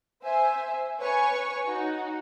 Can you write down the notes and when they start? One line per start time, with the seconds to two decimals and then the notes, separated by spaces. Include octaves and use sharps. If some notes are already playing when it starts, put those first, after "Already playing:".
0.22 C5 E5 G#5
0.99 B4 C#5 G#5 C#6
1.66 D#4 F#4